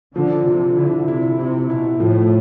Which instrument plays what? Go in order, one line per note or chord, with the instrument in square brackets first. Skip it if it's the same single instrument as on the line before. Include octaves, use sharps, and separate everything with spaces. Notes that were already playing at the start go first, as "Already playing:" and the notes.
[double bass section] D3 [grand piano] F3
[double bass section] C3 [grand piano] F3
[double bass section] D3 [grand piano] E4
[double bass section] C3 [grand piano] E4
[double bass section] C3 [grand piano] E4
[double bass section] B2 [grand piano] E4
[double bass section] A2 [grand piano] F3